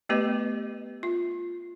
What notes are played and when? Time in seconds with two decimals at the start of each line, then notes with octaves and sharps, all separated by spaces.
0.09 A3 B3 G4 B4 D#5
1.03 F4